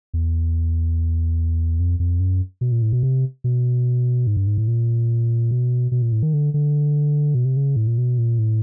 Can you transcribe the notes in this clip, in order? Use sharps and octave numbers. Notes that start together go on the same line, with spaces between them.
E2
F2
F2
F#2
B2
A#2
A2
B2
C3
B2
G#2
G2
G#2
A2
A#2
B2
B2
A#2
A2
D#3
D3
D3
B2
C3
C#3
A2
A#2
B2
A#2
A2